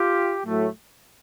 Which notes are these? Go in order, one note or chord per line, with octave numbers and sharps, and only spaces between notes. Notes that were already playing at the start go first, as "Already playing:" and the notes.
Already playing: F4 G4
A2 F#3 A3